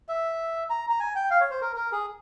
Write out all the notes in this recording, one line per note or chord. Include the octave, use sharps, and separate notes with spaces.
E5
A#5
A#5
G#5
G5
F5
C#5
C5
A#4
A#4
G#4